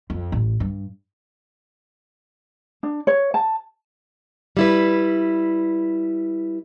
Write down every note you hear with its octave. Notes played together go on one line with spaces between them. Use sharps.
F2
A1
G2
D4
C#5
A5
G3 E4 B4